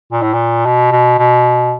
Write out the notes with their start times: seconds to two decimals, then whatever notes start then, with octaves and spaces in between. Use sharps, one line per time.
0.12 A#2
0.22 A2
0.34 A#2
0.66 B2
0.91 B2
1.18 B2